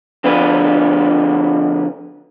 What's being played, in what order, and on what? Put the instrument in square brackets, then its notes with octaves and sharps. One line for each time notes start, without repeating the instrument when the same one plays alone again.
[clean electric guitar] D3 F3 B3 D4 B4